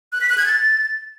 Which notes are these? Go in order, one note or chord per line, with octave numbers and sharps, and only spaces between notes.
F#6
B6
F#6
G#6
A6